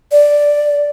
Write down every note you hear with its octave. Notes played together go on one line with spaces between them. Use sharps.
D5